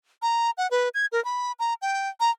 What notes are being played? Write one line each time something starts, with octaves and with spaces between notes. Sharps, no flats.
A#5
F#5
B4
G#6
A#4
B5
A#5
G5
A#5